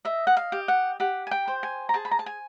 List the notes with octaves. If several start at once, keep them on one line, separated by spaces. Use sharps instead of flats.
D#5 E5
F#5
F5
G4
F#5
G4 F#5
G#5
G5
C5
G#5
A#5
G#4 A5
B5
A#5
A5
G#5